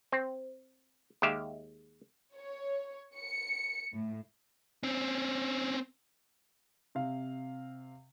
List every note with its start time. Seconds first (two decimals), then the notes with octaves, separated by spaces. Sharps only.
0.12 C4
1.22 D#2 G#3 G4 E5 F5
2.36 C#5
3.17 C#7
3.93 A2
4.83 C4 C#4
6.95 C3 F5